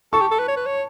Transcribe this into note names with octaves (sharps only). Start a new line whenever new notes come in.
A4 A5 C#6
G4
A4
B4
C#5
B4
C#5